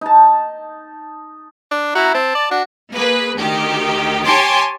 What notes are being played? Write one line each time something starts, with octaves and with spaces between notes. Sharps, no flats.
D#4 A5
D4
E4 F#4 A#5
C4 A5
D5
D4 F#4
A#3 G#4 B4
D2 D#3 G4
G4 C#5 G#5 A5 C6 D6